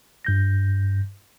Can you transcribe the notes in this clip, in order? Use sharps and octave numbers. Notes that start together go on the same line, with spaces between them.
G2 G6 A#6